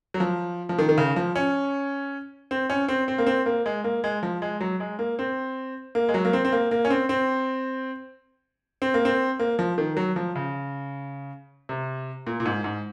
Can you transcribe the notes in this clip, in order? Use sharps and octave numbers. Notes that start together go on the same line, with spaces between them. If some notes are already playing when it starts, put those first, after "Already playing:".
F#3
F3
F3
D#3
D#3
C#3
F3
C#4
C4
C#4
C4
C4
A#3
C4
A#3
G#3
A#3
G#3
F3
G#3
F#3
G#3
A#3
C4
A#3
G#3
F#3
A#3
C4
C4
A#3
A#3
C#4
C4
C4
C4
A#3
C4
A#3
F3
D#3
F#3
F3
C#3
C3
A#2
A#2
G#2
G#2